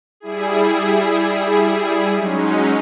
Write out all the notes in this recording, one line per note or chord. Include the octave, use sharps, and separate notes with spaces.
G3 E4 G#4
F#3 G#3 C#4 D#4